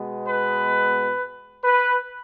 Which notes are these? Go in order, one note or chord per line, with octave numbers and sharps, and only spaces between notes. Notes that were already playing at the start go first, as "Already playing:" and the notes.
Already playing: B2 G#3 B3
B4
B4